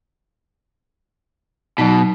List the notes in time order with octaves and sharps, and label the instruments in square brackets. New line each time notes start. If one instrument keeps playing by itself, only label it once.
[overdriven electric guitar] B2 [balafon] F#3 D#4